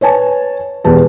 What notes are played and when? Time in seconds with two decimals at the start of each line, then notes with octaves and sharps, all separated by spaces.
0.01 B4 C#5 G#5 A5
0.84 E1 E2 G4 B4 A5